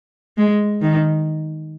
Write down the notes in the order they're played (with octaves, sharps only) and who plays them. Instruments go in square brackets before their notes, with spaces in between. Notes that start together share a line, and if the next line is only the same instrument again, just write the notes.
[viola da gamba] G#3
D#3